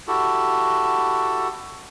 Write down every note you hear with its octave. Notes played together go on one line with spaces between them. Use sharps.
E4 F#4 G4 A4